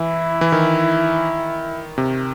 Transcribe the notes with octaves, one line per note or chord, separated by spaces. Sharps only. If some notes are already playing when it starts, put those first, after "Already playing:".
Already playing: E3 E4
E3
D#3
C3